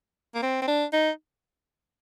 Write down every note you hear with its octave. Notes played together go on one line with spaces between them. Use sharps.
A#3
C4
C4
D4
D#4